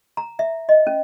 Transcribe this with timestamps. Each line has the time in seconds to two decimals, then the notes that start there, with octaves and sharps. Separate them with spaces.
0.17 A#5
0.39 E5
0.69 D#5
0.87 C#4